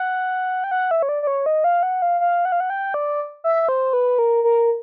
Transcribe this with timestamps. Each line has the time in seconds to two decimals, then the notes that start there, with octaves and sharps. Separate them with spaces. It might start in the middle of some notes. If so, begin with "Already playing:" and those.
Already playing: F#5
0.64 G5
0.71 F#5
0.91 E5
1.02 C#5
1.09 D5
1.23 D5
1.27 C#5
1.46 D#5
1.64 F5
1.83 F#5
2.02 F5
2.21 F5
2.45 F#5
2.52 F5
2.60 F#5
2.70 G5
2.94 D5
3.44 E5
3.68 C5
3.93 B4
4.19 A#4
4.44 A#4